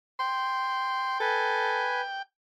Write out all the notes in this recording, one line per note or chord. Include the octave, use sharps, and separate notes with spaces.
G5 C6
A4 B4 G#5